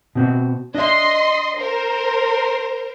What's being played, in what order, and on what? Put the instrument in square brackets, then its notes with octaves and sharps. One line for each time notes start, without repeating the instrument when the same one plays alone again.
[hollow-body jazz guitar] B2 C4 F#4
[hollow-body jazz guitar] D4 E5 [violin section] D#5 C6
[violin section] A#4 C5